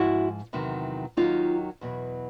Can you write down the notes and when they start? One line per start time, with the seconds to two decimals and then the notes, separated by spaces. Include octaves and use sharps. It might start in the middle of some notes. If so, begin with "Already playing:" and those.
Already playing: G#2 F3 E4 F#4
0.53 E2 C3 D#3 F#3
1.17 D#2 D#3 F#3 D#4 F4
1.81 E2 B2 F#3